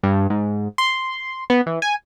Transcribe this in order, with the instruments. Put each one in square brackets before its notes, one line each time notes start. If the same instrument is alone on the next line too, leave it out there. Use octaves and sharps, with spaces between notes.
[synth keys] G2
G#2
C6
B3
E3
G#5